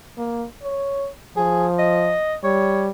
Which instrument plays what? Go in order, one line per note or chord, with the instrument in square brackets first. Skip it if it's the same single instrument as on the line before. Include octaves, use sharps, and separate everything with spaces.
[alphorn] A#3
C#5
[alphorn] F3 [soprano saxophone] G#4
[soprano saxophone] D#5
[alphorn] G3 [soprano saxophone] C#5